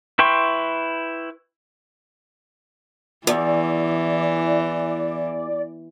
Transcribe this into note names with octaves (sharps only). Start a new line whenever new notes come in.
E4 B4 G5 C6 C#6
E2 E3 D5